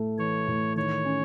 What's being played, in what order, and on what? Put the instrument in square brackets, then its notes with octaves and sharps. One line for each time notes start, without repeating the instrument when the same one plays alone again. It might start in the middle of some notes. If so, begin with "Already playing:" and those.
Already playing: [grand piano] A2 A3
[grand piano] E3 [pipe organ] C#5
[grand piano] A2
[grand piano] D#3 [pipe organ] C#5
[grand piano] C#4